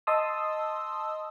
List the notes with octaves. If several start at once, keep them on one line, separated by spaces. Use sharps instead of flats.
D#5 A5 C6 D#6 E6